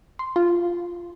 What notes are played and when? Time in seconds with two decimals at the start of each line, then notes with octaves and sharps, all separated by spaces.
0.19 C6
0.36 F4